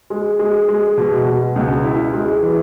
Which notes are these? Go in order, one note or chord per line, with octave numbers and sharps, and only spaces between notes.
G#3
G#3
G#3
B2
B2
C#2
E4
G#3
E3